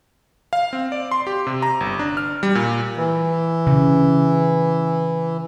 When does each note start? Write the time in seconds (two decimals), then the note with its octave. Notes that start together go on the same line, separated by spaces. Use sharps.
0.53 F5
0.73 C4
0.92 D5
1.11 C6
1.27 G4
1.47 C3
1.62 A#5
1.80 G1
1.99 D4
2.17 F6
2.43 G3
2.55 A#2
2.97 E3
3.67 C#3